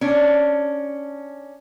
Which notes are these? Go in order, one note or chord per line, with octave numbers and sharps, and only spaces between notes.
C#4 D4